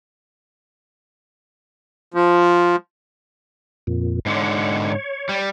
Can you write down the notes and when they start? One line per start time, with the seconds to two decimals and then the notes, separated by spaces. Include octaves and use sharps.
2.14 F3
3.87 F2 A#2
4.26 G#2 D3 C#5 F#5
4.84 C#5
5.29 G3